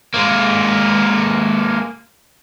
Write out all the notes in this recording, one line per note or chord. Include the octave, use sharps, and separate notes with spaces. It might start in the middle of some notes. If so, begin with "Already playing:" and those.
G#3 A#3